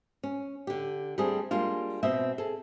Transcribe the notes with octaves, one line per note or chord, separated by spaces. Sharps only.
C#4
D3 G4
G3 A3 C4 D4 G#4
G3 G#3 A#3 D4 F4
B2 C4 D#5 E5
G#4 A4